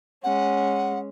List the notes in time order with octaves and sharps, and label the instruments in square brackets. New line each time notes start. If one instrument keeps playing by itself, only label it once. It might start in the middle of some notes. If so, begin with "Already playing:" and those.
[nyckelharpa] G#3 C#4 [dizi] F#5